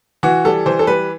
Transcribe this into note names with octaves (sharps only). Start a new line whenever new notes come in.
E3 F#4
G3 A4
E3 C5
A4
G3 B4